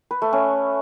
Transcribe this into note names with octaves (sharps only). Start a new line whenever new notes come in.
B4
A3
C#4